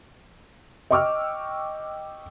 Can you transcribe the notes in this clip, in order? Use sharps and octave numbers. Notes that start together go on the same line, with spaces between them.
D#5 G5 C#6 D6 E6 F6